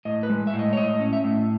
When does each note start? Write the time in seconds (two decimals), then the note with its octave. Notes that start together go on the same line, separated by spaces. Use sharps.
0.05 A2 D#5
0.23 B4
0.29 G#3
0.47 E5
0.54 A2
0.59 D#5
0.73 C#5
0.77 A2 D#5
1.00 C#4
1.13 E5
1.24 A2